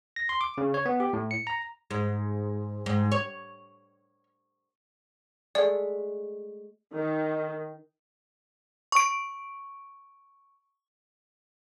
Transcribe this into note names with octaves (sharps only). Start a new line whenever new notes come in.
A#6
C6
D6
C#3
C#5
B3
G4
A2
C#7
A#5
G#2
G#2
C#5
G#3 A3 D5 C6
D#3
C#6 D7